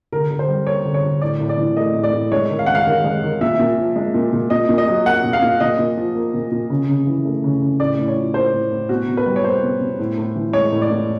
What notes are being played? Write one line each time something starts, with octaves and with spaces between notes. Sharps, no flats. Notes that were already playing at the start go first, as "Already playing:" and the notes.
D3 A#4
D3
C5
G3
A#3 C#5
D3
C#5
D3
A2 D5
A2
D5
E3
A3 D#5
A2
D5
A2
G#3 C#5
D#3
F5
G#3 F#5
F5
D#3
G#3
D#3
A#2 E5
A#2
F3
G#3
A#2
A#2
A#2 D#5
A#2
D#5
F#3
A#3 F#5
A#2
F5
A#2
A#2 D#5
A#2
F3
A#3
A#2
A#2
C#3
C#3
E3
A3
C#3
C#3
A2 D5
A2
C#5
F3
A#3 C5
A2
A2
B2 F#4
B2
B4
G3
C#5
A#3 C5
B2
B2
A2
A2
E3
G#3 C#5
A2
D5
A2